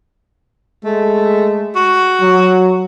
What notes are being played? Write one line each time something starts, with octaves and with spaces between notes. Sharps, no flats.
G#3 A3
F#4
F#3